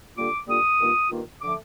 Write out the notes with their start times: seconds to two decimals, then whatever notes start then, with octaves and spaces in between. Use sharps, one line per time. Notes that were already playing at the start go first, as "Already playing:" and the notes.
0.16 D3 G3 A#3 F4 D6
0.48 D3 G3 A#3 F4 D#6
0.79 G2 D#3 A#3 F4
1.10 G2 D#3 A#3 F4
1.41 D3 F3 A3 D6